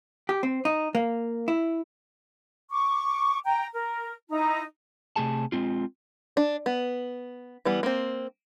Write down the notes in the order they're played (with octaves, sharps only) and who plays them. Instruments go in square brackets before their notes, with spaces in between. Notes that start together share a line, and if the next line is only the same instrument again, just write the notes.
[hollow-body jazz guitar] G4
C4
D#4
A#3
E4
[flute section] C#6 D6
G5 A#5
A#4
D#4 E4 A#5
[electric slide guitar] C3 A3 G#4 A5
G#3 C4 F4
[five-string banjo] D4
B3
E3 G3 B3
A#3 C4